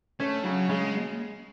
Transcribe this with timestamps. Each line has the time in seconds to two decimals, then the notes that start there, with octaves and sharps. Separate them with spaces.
0.20 A3 C#4
0.44 C#3 F#3
0.69 C#3 G#3